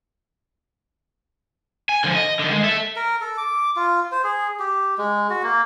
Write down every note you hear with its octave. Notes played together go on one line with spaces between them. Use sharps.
G#5
D3 F3
D#5
D3 D#3
G#3
A4 E5
A#4
A4
D6
F4
C5
G#4
G4
G#3
F#4
A#3